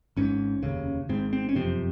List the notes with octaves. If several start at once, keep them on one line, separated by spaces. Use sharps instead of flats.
G#1 G#2 C#4
F1 D#2 C#3
G#1 G#2 C4
C4
C#4
F#1 F2 C3 C4